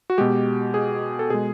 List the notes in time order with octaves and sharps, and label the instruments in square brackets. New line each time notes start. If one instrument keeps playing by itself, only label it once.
[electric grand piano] F#4
B2 G#3 G4
G#4
A4
B2 G#3 G#4